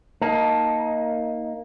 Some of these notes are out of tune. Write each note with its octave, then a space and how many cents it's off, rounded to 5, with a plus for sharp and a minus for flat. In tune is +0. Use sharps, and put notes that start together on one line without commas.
A#3 +0 D#4 +15 A5 +0